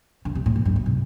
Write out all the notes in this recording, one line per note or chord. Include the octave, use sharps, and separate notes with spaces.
D3
C3
A2
A#2
G2
A2
C3